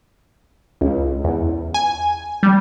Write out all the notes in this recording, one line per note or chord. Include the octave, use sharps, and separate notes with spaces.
C#2
E2
G#5
G3